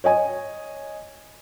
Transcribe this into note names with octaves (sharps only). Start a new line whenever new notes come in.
C#5 D#5 G#5